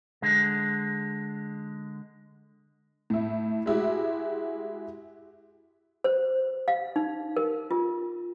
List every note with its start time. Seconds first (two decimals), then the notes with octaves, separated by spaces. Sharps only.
0.22 D3 G#3
3.10 A2 E4
3.66 G#3 E4 F#4 G4
6.04 C5
6.68 F5
6.96 D#4
7.37 A#4
7.71 F4